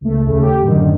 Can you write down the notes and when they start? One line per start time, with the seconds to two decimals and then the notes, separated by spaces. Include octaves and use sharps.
0.01 C#2 A3
0.26 D#2 C#3 A3
0.42 G4
0.62 F#2 A2 D3 D#3